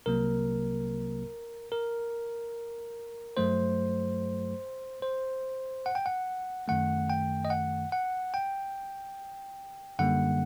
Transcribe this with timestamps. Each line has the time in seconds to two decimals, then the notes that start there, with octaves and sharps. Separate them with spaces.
0.06 C2 C3 F#3 A#3 A#4
1.72 A#4
3.37 G2 F#3 A3 C5
5.02 C5
5.86 F#5
5.95 G5
6.06 F#5
6.68 F#2 D#3 A3 F#5
7.10 G5
7.45 D#5
7.50 F#5
7.92 F#5
8.34 G5
9.99 F#2 D3 G3 A#3 F#5